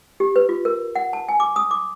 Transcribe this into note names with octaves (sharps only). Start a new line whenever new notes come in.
G4
B4
F4
A#4
F#5
A5
G#5
D6
D#6
D6